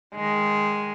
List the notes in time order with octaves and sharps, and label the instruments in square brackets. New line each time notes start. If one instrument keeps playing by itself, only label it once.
[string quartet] D#3 G#3